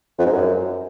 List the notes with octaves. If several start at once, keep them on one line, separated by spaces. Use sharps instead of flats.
F2
G#2
F#2